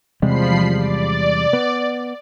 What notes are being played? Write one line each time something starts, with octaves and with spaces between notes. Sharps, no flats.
E2 C3 F3 G3 G#3 B5 C7
D5
B3